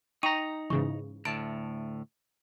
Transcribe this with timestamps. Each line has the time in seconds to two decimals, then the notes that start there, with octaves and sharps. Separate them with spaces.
0.23 D#4 G5 A#5 C#6 D#7
0.70 G#2 C#3 E3 C#6
1.25 D2 A2 A5 D7